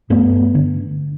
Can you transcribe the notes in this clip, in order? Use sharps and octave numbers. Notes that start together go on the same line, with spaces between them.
G2 A3 B3
D3